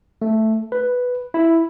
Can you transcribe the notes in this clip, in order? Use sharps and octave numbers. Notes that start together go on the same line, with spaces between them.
A3
B4
E4